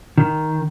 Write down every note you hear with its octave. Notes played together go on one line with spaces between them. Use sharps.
D#3